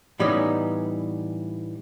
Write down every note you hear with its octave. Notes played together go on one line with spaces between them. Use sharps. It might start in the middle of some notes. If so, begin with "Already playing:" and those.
A2 E3 G3 B3 C#4 D#4